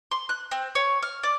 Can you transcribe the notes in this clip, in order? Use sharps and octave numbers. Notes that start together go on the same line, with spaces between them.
C6
F#6
C4
C#5
F6
D5